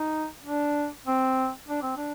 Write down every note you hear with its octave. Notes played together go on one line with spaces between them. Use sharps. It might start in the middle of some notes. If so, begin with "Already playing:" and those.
Already playing: D#4
D4
C4
D4
C4
D4